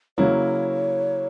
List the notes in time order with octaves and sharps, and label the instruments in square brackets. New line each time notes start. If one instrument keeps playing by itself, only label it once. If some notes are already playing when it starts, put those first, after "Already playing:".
[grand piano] C#3 F#3 A#3 C#4 E4 [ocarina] C#5